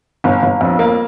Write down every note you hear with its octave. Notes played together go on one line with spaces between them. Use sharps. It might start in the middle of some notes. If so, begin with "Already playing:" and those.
G1
G1
F2
A#3